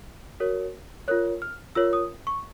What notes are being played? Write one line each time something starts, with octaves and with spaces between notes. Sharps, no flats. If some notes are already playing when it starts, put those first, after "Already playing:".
F#4 A#4 C#5
F4 A#4 C#5 F#6
F6
F4 A#4 C#5 E6
D#6
C#6